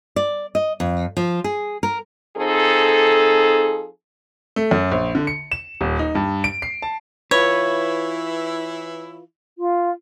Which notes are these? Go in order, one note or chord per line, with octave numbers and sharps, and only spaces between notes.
D5
D#5
F2
F3
G#4
A#4
F3 C4 D#4 G#4 A4
A3
F#2
A#1
D3
C#7
E7
D#1
D#4
G2
D7
C7
A5
E3 E4 F4 B4 C#5
F4